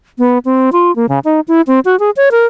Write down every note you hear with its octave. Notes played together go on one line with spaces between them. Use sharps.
B3
C4
F4
A#3
C#3
D#4
E4
C4
F#4
G#4
C#5
A#4